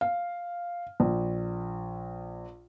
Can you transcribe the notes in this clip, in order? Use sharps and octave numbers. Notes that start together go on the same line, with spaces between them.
F5
A#1